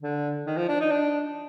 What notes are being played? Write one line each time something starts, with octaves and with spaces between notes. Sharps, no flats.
D3
D#3
F3
D4
D#4
D4